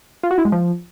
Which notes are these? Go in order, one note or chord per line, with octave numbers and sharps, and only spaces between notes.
F4
F#4
E4
G#3
F3